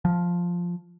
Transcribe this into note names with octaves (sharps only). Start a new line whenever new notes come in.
F3